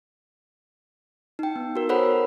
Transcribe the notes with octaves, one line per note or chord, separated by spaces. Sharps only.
D#4 G5
B3
F#4 A#4
A4 A#4 C5 C#5 F#5 B5